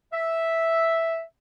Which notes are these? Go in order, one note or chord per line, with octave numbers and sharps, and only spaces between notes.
E5